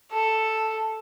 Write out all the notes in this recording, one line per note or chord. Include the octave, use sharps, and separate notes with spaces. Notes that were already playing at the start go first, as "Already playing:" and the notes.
A4